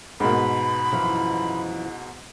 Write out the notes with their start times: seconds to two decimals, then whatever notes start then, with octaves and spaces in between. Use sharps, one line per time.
0.20 G#2 B2 A#3 C4 B5
0.36 B4
0.92 F#2 E3 F3